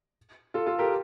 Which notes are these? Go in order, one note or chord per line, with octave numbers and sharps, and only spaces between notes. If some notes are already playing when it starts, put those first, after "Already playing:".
F4 A4
F4 A4
G4 A#4